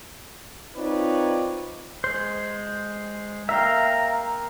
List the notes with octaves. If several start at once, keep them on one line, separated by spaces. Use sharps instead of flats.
C4 D#4 F4 B4 C#5 D5
G#3 C5
A#3 A#4 E5 F5 G5 A#5